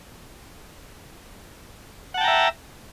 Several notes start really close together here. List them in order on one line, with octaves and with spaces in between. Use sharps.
F#5 A5 G5 A#5 E5